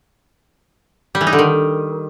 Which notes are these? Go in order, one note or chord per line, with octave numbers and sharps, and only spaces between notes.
G3
E3
D#4
D3
D#3